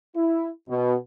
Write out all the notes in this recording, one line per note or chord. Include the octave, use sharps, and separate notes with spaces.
E4
B2